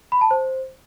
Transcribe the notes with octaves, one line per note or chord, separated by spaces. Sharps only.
B5
A5
C5